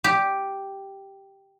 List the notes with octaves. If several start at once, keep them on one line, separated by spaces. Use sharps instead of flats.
G4